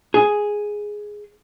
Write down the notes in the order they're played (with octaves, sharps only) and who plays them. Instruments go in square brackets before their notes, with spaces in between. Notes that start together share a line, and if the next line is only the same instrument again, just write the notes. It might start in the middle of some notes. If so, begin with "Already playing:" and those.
[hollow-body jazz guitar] G#4